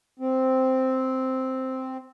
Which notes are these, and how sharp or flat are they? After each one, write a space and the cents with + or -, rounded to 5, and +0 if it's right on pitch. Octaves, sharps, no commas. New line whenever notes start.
C4 -5